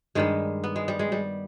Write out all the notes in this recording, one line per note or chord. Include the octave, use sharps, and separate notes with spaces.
G2 D#3 G3 G#3
B3
G#3
G3
G#3
G3